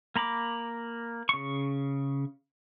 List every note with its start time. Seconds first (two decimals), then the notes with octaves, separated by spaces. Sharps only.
0.16 A#3 A#5 B5 D6
1.29 C#3 C#6